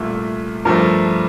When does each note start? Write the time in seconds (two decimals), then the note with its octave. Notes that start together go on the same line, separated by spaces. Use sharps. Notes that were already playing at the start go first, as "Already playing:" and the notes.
Already playing: C2 A#2 A3
0.65 G2 F3 A3 A#4